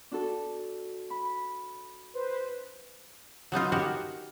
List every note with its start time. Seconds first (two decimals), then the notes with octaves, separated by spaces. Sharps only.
0.11 D4 F#4 A4
1.10 B5
2.14 B4 C5
3.52 F#3 B3 D#4 F4
3.72 F#4 G4 A#4 F#5